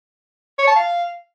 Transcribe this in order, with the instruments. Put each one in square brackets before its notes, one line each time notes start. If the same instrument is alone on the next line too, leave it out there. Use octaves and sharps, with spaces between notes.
[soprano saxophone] C#5
A5
F5